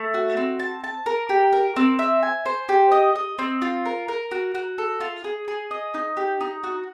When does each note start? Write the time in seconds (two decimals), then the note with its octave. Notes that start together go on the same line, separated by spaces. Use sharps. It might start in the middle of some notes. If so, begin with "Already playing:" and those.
Already playing: A3
0.14 F#4
0.37 C4
0.59 A5
0.84 A5
1.06 A#4
1.29 G4
1.52 A#4
1.76 C4
1.99 E5
2.23 G#5
2.46 C5
2.69 G4
2.92 D#5
3.15 D#5
3.39 C4
3.62 F4
3.85 A#4
4.08 A#4
4.31 F#4
4.55 F#4
4.78 A4
5.00 F4
5.24 G#4
5.48 G#4
5.71 D#5
5.94 D#4
6.17 G4
6.41 D#4
6.64 F#4